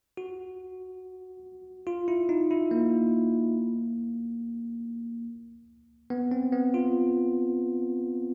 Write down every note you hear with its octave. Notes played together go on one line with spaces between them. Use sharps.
F#4
F4
E4
D#4
E4
A#3
B3
C4
B3
F4